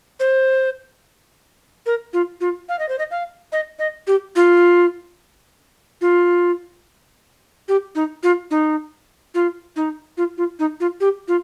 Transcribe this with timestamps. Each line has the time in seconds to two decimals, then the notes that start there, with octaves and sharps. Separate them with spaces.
0.20 C5
1.86 A#4
2.13 F4
2.41 F4
2.69 F5
2.79 D#5
2.89 C5
2.99 D#5
3.11 F5
3.52 D#5
3.79 D#5
4.07 G4
4.36 F4
6.01 F4
7.68 G4
7.95 D#4
8.23 F4
8.51 D#4
9.35 F4
9.76 D#4
10.17 F4
10.38 F4
10.59 D#4
10.80 F4
11.00 G4
11.28 F4